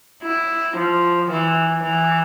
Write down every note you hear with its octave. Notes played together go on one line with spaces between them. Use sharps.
E4
F3
E3
E3